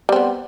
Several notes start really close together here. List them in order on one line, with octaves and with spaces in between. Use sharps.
G3 C4 B3